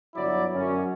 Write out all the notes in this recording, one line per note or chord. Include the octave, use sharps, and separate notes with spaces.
G1 F#3 E4 D5
F#2 C#4